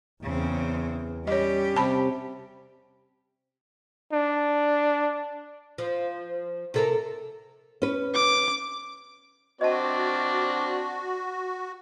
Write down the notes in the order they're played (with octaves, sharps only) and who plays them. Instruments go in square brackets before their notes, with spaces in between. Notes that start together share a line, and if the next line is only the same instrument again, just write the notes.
[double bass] E2 [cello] C#3 C4
[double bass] G3 [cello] C#4 G4 [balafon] C#5 D#5
[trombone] C3 [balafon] A5 B5
[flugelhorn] D4
[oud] F3
C3 A4 A#4
[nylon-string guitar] C#4 B4
[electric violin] D6
[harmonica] C4 D4 D5 [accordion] F#4 [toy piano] D#5 A5